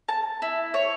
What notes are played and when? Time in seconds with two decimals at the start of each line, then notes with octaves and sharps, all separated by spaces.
0.09 A5
0.42 E4
0.74 C#5